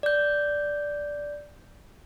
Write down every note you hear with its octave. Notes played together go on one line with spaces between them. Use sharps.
D5 G6